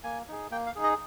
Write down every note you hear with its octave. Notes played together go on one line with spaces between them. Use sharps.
A#3 G#5
D#4 G#4
A#3 G5
F5
D#4 G#4
D#5